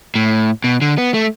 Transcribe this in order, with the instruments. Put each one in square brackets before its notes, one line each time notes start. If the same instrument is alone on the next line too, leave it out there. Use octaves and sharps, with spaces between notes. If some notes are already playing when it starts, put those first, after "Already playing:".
[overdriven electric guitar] A2
B2
D3
B3
A3